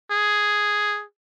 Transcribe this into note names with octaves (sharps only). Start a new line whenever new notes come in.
G#4